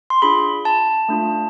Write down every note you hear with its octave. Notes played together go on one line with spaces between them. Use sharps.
C6
D4 F4 G#4 B5
A5
A3 D4 F4